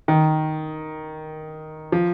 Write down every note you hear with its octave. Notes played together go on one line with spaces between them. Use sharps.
D#3
F3